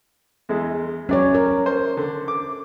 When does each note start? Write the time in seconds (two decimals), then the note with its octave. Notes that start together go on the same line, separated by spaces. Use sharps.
0.49 E2 G#3 E4
1.09 F#3 C#4 C#5 D5
1.35 A#4
1.66 C5
1.97 D3
2.28 D6